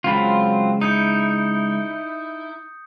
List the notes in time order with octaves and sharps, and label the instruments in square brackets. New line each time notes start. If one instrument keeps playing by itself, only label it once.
[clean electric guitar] C#3 G#3 B5 [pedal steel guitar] F#3 C4 F4
[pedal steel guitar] D#4 E4 [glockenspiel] D#6 G6 C#7